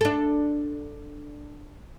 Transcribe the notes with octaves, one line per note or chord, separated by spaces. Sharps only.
D4 A4